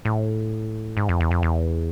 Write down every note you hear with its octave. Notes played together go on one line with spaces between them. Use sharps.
A2
G#2
F2
E2
F2
E2